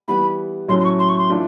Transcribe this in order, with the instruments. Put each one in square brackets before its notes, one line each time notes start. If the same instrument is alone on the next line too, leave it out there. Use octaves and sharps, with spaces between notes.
[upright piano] E3 G3 B3 [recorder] B5
[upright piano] A2 F#3 A3 C#4 [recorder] C6
[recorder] C6
C#6
C6
C#6
C6
[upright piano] E3 A3 D4 F4